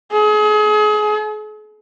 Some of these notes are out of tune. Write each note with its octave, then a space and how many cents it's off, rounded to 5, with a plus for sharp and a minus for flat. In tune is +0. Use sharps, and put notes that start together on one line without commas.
G#4 +35